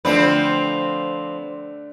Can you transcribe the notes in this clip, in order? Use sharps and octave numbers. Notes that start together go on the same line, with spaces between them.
D3 F3 A3 C4 D4 B4